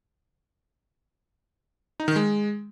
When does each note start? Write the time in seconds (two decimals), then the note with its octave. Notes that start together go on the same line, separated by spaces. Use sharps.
2.00 D#4
2.08 D#3
2.16 G#3